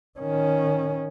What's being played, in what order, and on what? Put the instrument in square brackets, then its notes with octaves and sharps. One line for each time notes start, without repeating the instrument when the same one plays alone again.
[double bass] D#3 C#4